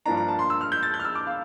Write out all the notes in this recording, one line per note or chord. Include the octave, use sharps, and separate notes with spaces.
G2 F3 A#3 D4 A#5
A#5
A5
C6
E6
F6
G6
A6
G6
F6
E6
D6
F5